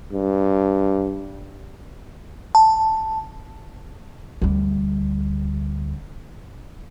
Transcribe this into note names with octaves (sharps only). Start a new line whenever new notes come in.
G2
A5
D2 G3